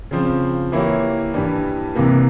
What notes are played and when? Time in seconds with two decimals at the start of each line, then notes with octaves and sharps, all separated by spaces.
0.11 C#3 F3 C4
0.72 E3 A#3 E4 G4 C#5
1.34 G2 E3 G3
1.95 C2 C3 E3 A#3